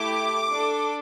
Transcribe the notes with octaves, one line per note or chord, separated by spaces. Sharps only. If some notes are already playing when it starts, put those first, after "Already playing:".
Already playing: A3 E4 G4 D6
D4 A4